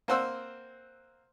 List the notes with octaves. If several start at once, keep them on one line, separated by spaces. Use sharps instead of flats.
A#3 C4 C5 F#5 E6